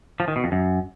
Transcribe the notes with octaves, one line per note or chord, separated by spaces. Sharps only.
F3
D#3
B2
F2
F#2